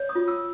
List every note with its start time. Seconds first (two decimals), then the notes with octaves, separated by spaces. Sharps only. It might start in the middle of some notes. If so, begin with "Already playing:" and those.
Already playing: C#5
0.09 D#6
0.15 F4
0.28 E6